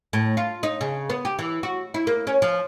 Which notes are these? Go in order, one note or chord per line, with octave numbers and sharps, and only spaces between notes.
A2
F4
D#4
C#3
B3
G4
E3
F#4
E4
A#3
C#4
F3